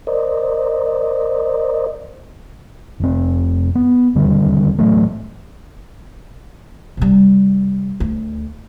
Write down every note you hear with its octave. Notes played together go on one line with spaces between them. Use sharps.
A#4 C5 D5 D#5
F1 C4
B3
E1 D#2 D3 G3
A2 E3 F#3 A3
C3 G3
D2